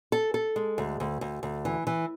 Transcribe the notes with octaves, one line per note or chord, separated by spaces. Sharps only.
A4
A4
G#3
D2
D2
D2
D2
E3
E3